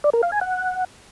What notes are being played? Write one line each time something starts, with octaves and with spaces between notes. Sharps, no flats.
D5
A#4
F5
G#5
F#5